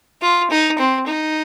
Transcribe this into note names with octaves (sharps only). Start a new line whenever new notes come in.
F4
D#4
C4
D#4